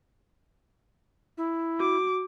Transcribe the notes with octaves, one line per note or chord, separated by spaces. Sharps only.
E4
F#4 D6